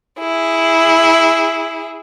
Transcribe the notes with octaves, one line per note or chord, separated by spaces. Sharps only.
E4 G#4